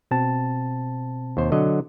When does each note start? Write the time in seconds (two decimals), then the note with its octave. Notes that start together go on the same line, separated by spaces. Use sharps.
0.11 B2 C4 A5
1.37 D#2 C5
1.52 D3 F#3 D#5